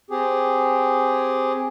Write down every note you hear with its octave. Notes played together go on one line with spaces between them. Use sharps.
C4 G4 G#4